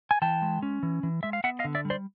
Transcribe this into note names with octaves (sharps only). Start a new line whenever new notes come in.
G#5
E3 G5 A5
G#3
C#4
E3
E3
G#3 E5
F5
B3 E5 F#5
D#5 F5
D3
D5 E5
G3
C5 D5